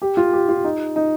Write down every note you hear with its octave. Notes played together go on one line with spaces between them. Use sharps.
G4
F4
G4
F4
D#4
D#4